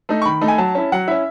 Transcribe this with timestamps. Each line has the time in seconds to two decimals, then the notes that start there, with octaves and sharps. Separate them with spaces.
0.09 A3 D#4
0.22 C#6
0.25 D#3 B5
0.41 A3 D#4
0.48 G#5
0.58 F#3 A5
0.75 C#4 E4
0.92 F#3 F#5
1.08 C#4 E4 E5